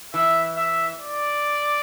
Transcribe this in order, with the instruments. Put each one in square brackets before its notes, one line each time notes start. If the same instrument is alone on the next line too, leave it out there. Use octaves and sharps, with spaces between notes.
[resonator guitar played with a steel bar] E3 [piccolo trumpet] E5
[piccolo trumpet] E5
D5